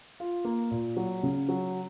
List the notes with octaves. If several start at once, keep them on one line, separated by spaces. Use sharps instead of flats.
F4
A#3
A#2
F#3
C#3
F#3